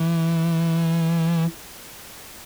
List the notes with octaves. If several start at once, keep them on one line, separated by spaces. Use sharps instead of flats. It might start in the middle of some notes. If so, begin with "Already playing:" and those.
Already playing: E3